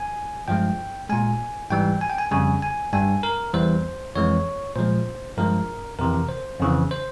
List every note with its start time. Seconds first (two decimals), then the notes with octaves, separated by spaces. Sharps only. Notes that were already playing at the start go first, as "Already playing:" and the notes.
Already playing: G#5
0.48 G2 F3 G#3 G5
1.09 A#2 G#3 G#5
1.70 G#2 E3 G3 G5
2.01 G#5
2.10 G5
2.18 G#5
2.31 F2 C#3 G3 G#5
2.62 G#5
2.93 G2 G3 G#5
3.23 A#4
3.54 E2 E3 G3 C5
4.15 F2 E3 G#3 C#5
4.76 A#2 F3 G#3 C5
5.37 G2 F3 G#3 A#4
5.98 F2 C3 E3 A#4
6.29 C5
6.60 F2 C#3 E3
6.91 C5